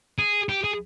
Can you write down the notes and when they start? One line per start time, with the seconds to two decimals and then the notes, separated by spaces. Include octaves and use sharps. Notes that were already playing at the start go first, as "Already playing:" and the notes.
0.18 G#4
0.49 G4
0.64 G#4